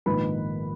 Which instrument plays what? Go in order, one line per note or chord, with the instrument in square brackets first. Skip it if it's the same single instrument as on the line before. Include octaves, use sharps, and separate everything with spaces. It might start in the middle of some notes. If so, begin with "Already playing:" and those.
[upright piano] A#1 G#2 D#3 A#3 B4 B5